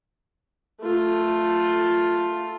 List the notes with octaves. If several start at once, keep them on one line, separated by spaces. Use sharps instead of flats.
A3 F4